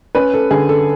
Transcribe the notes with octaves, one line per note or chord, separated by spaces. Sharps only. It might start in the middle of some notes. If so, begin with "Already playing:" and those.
C#4 B4
A4
D3 G#4
A4